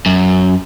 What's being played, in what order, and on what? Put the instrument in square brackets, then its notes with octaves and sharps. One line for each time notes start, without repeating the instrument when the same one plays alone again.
[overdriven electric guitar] F#2